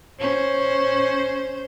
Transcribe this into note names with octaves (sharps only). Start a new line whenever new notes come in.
C#4 C5